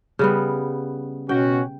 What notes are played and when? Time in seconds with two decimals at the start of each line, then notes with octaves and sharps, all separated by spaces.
0.19 C#3 G3 B3
1.29 B2 C#4 F#4 G5